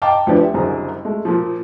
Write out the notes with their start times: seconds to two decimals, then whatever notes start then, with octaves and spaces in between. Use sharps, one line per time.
0.02 D#5 F5 G5 A5 A#5 D6
0.27 D2 F3 B4 D5
0.40 G4 E5
0.54 F#1 C2 F#2 D3 G#4 A#5
1.05 G#3 A3
1.25 A#2 F3